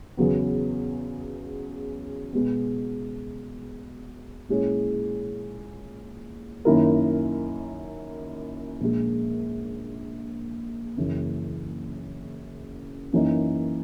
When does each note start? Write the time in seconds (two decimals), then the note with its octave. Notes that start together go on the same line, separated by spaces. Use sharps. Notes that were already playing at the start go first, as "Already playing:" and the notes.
0.17 E2 C#3 F#3 B3
2.33 B2 G#3 B3
4.49 A#2 G#3 C#4 E4 G#4
6.65 F#2 D#3 A#3 E4 A#4
8.81 A#1 A#2 G#3
10.97 F#1 F#2 C#3 E3
13.13 F#2 E3 A#3 D#4